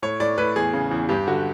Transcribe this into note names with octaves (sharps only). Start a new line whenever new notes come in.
A2 C#5
A2 D5
A2 B4
E2 G#4
C#3
E2
G2 G4
D3 F#4